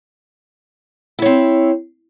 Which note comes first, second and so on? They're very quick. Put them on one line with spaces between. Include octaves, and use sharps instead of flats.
E4 C#5 C4